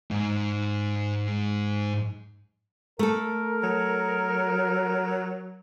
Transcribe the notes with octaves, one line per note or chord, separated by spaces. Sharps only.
G#2 D#4
A3 A4 A#4
F#3